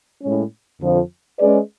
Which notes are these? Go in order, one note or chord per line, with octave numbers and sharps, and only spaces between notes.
A2 G#3 C#4
F2 D3 F3
G#3 C#4 G#4 B4 D5